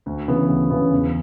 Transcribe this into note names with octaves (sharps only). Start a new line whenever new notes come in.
D2
C#3 E3 B3
D2
C#3 E3 B3
E2